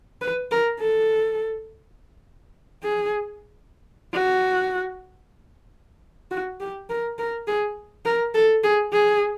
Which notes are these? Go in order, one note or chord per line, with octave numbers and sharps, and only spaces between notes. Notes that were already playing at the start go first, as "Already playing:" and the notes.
B4
A#4
A4
G#4
F#4
F#4
G4
A#4
A#4
G#4
A#4
A4
G#4
G#4